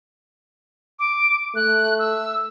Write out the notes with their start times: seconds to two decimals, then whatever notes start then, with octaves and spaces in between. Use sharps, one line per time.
0.99 D6
1.56 A3 F#6
1.99 E6